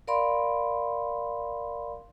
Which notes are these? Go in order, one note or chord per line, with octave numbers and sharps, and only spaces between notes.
A#4 D5 F5 B5 C6